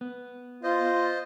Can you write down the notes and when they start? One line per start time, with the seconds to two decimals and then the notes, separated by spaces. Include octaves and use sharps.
0.01 B3
0.63 F4 C5 D#5